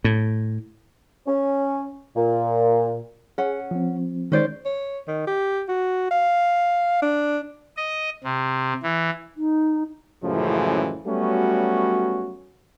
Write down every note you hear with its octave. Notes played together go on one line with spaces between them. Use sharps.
A2
C#4
A#2
C#4 G#4 F#5
F3 C4
D#3 G#3 C#4 C5 D5
C#5
D#3
G4
F#4
F5
D4
D#5
C3
E3
D#4
F#2 A2 C#3 E3 F3 G#3
F#3 G3 A3 B3 C#4 F#4